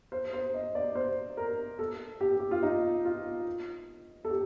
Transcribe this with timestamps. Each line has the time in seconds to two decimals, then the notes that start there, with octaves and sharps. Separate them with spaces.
0.12 C5
0.33 C5
0.54 D#5
0.75 D5
0.95 C5
1.37 A#4
1.79 A4
2.21 G4
2.40 G4
2.51 F4
2.63 D#4
3.05 F4
4.25 A4
4.30 G4